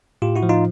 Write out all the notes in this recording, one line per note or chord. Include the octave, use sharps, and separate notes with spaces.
A2 F4 G4
E4 F#4
F3
D#4 F4